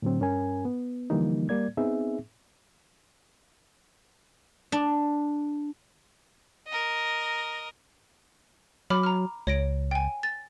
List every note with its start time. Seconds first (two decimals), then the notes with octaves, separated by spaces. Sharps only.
0.02 A2 D3 F#3 C4
0.20 G2 C#4 A#4 G#5
0.65 B3
1.10 D3 E3 F3 G3 A#3 D#4
1.49 G3 A#3 D5 G#6
1.77 B3 C4 D#4 G#4 E5
4.72 D4
6.68 A#4 D#5
8.90 F#3 B5 D6 F6
9.03 A#5 F6
9.47 C#2 C#5 A#6 D7
9.91 G5 G#5
10.23 A6